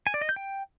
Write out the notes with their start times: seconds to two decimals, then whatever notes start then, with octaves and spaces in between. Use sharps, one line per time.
0.07 G#5
0.14 D5
0.21 D#5
0.29 G6
0.36 G5